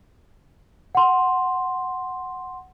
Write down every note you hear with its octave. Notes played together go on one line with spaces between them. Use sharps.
F#5 C6